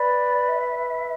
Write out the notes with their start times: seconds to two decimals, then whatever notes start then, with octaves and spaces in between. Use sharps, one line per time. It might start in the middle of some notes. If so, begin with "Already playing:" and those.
Already playing: B4 D5
0.49 E5